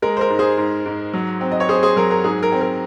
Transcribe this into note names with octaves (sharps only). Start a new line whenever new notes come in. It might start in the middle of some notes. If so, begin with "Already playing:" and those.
G#3 A#4
C5
A#4
G#2
G#4 C5
G#2
G#2
F#3
C4
D#5
C#5
C4 G#4 C5
G#4 C5
F#3 A#4
A#4
G#2 G#4
A#4
C4
A#4